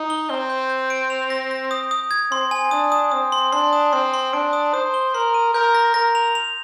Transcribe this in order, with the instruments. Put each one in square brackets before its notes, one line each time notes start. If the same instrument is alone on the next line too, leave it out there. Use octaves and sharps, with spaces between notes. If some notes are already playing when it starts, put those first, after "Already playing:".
Already playing: [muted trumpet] D#4
[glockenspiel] G7
[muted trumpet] C4 [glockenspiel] G7
[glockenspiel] G6
G6
D7
F7
A#6
A#6
D#6
D#6
G#6
[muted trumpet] C4 [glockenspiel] C6
[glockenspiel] G#5
[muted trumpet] D4 [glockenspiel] D#6
[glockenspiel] D#6
[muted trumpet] C4 [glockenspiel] D#6
[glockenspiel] C6
[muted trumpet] D4 [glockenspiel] C6
[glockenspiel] D#6
[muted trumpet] C4 [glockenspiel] C6
[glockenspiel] C6
[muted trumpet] D4 [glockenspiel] D7
[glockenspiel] D#6
[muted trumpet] C5 [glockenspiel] D#6
[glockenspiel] G7
[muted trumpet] A#4 [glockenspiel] C6
[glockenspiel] D#7
[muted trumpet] A#4 [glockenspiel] G6
[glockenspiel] A#6
[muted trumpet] A#4 [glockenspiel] A#6
[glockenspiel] F7
F7